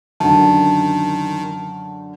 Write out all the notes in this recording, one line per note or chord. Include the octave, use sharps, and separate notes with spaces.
F#2 D3 D#3 A5